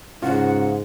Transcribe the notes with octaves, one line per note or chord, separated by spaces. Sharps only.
G#2 C#3 F4 F#5